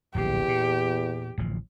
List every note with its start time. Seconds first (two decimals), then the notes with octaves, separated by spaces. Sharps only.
0.15 D1 A#1 E2 C3 G4
0.48 A#2
1.38 D1 A1 F3